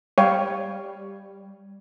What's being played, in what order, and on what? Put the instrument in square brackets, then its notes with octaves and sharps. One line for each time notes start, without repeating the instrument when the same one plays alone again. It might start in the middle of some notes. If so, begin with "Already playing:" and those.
[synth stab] G3 [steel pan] C#5 F5 G5